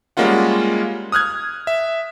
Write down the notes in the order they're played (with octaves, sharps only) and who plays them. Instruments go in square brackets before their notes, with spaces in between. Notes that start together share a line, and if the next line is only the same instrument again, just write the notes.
[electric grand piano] G3 G#3 A#3 C#4 F4 F#5
D#6 F6 F#6 G#6
E5